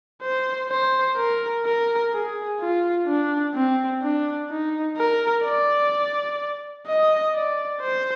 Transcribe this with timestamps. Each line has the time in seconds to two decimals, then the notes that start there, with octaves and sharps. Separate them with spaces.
0.22 C5
0.70 C5
1.17 A#4
1.65 A#4
2.12 G#4
2.60 F4
3.06 D4
3.54 C4
4.02 D4
4.50 D#4
4.97 A#4
5.44 D5
6.87 D#5
7.34 D5
7.81 C5